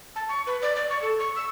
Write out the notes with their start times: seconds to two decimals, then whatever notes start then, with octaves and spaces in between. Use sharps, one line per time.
0.16 A5
0.29 C#6
0.47 B4
0.62 D5
0.76 D5
0.90 C#6
1.02 A4
1.19 C#6
1.36 E6